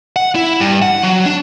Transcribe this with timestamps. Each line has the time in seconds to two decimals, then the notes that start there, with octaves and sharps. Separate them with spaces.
0.16 F#5
0.35 E4
0.60 G2
0.82 F#5
1.03 F#3
1.26 D4